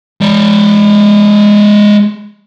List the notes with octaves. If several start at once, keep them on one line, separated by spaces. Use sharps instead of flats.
G#3 D5